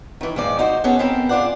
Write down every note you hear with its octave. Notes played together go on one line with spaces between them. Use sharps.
D#3 E3
D#2 G#2 F3 D5
D#4 F#4 C5
B3 C#4 G#4 A4 C#5
B3 C4 A4 A#4
C#3 D4 F4 D5 F#5